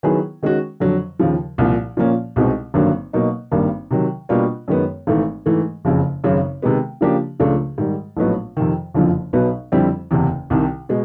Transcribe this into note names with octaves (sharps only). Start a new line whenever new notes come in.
D#3 F#3 B3 E4 G#4
D#3 G#3 C#4 F#4
F2 D3 F#3
D#2 C#3 F3
C2 A#2 F3
A#2 F3 A#3 C#4
C2 B2 G#3 C4 D#4
G#1 G2 D3 F#3 A#3
B2 F#3 A#3 D#4
G#1 G2 D#3 G3 A#3
C3 D#3 F#3
B2 G3 A#3 D4 F4
F#2 D#3 G#3 B3
G#1 G#2 E3 A3
G#2 E3 A3
F#1 F2 C#3
G#1 F#2 C#3 F#3
C3 D#3 G#3 B3
C#3 F3 A#3 D4 G4
C#2 C#3 F3 A3 D4
G#2 D#3 G3
A#1 A2 F#3 B3 D#4
F2 C3 D#3
F#1 F2 D3 F3
B1 B2 F#3 B3
F2 D3 G3 C4 E4
F#1 E2 C3
C2 C3 D#3
B2 G#3